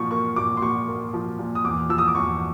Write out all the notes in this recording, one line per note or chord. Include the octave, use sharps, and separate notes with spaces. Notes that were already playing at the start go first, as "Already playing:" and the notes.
Already playing: A#2 F3 C#6
A#3 C#6
A#2 D6
C6
A#2 C#6
A#3
F3
A#2
D#6
E2 D6
F3 E6
D#6
D6
E2 C#6